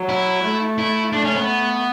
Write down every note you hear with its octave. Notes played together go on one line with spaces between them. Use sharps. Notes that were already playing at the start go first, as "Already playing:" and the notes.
Already playing: F#3
E4
A3
E4
A3 D4
C#4
B3